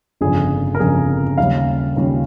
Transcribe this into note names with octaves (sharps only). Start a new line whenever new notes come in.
G1 F2 C#3 G#4
A#4
G1 F2 C#3 G#4
D#2 C#3 G3 C#4 F5
D#2 C#3 G3 C#4